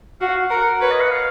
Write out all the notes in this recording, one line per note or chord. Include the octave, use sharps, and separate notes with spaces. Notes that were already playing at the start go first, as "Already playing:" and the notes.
F#4 F5
A#4 F#5
F#5
B4 C#5
D#5
F#5
F5